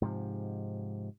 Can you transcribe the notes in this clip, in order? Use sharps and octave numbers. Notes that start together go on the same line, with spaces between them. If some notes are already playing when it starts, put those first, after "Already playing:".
G#2 C3 F3